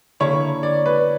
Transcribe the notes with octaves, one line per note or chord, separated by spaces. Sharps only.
D3 A#3 E4 C#5
D5
B4